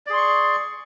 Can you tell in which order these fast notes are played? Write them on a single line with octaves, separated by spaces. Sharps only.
D5 G#4 C6 C#6